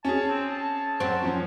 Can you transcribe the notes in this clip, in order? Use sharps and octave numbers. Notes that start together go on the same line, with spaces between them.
C#4 G#4 A5
C4
A5
F#2 C4
F3 C#4